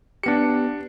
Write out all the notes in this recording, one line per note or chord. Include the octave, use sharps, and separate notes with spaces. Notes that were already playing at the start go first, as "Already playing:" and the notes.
B3 D4 G4 C#7